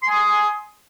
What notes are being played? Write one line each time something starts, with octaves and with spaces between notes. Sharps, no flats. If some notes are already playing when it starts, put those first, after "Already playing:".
G#5 C6 D#6